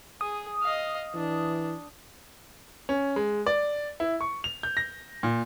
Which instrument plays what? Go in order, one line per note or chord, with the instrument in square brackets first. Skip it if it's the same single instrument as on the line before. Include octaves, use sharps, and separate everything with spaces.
[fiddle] G#4 [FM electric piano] D#6
[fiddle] D#5 F5
[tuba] E3 [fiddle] D4
[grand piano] C#4
G#3
D5
E4
C#6
F7
G6
A#6
A#2